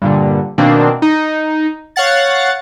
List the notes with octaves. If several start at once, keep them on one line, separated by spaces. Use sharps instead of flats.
G2 A#2 D3
B2 D#3 A#3 C4 D4
D#4
C#5 F5 F#5 A6